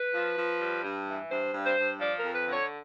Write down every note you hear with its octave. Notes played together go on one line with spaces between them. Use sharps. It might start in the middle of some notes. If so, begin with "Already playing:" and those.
Already playing: B4
F3
F3
G3
G2
E3
G2 C5
G2
C5
G2
F3 D5
A#4
F2
B4
D3
C#5